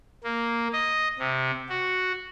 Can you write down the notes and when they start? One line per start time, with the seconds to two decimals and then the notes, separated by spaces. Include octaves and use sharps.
0.23 A#3
0.73 D#5
1.19 C3
1.69 F#4